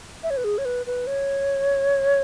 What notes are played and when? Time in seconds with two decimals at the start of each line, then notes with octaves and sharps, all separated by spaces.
0.23 E5
0.30 C#5
0.37 B4
0.44 G#4
0.58 C#5
0.65 B4
0.86 B4
1.07 C#5